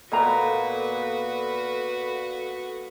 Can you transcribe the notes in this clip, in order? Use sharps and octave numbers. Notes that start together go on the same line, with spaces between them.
A#2 B3 F#4 A4 B4 D#5 A#5